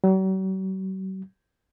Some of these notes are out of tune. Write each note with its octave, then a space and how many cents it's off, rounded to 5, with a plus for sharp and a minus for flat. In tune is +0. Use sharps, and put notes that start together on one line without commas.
F#3 +45